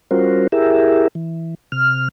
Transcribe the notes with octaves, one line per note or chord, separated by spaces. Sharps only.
G3 C#4 F4 F#4 A#4 C5
E4 G4 G#4 A#4 E5
E3
C3 F6